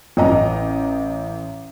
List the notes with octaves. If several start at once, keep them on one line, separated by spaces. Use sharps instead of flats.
A1 D#5 A#5